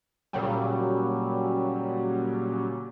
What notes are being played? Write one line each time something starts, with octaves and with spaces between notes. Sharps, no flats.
A#2 C#3 F#3 G3